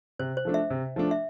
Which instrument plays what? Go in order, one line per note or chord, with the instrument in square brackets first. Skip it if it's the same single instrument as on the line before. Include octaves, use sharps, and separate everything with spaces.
[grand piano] C3 [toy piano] C5
[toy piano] C5
[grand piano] F3 A3 D4
[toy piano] E5
[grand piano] C3
F3 A3 D4
[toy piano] E5